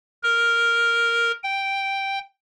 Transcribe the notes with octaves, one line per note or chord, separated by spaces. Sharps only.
A#4
G5